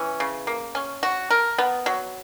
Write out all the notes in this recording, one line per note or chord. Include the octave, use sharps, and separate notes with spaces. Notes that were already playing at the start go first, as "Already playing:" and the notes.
Already playing: E3 C#4
C#3
A#3
C#4
F#4
A#4
B3
F#3